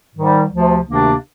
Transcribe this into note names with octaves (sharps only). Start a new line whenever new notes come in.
G#2 D#3 G3
D2 C3 F3
D2 C3 D#3 A#3 D4